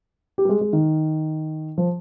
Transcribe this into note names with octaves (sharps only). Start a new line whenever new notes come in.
G4
G3
G#3
G#3
D#3
F3